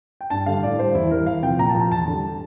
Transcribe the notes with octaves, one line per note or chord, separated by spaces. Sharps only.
G5
G2 A5
D3 G3 F5
A2 D5
G3 C5
E2 E4
E3 G3 A#4
E2 F5
C3 F3 G5
A#2 A#5
A5
F3
A5
E2 A5
D3 G3